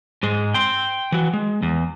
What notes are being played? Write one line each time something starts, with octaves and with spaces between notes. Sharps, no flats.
G#2 G#3
G5 C6
E3 F#4
G#3
E2